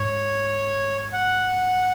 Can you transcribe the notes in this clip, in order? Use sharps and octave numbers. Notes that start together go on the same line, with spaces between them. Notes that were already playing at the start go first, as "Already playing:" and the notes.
Already playing: G#2 C#5
F#5